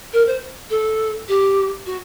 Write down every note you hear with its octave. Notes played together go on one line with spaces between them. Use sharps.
A#4
C5
A4
G4
F#4